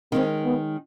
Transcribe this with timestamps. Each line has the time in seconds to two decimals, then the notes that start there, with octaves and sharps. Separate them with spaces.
0.12 D#3 G#3 C4 C#4
0.44 B3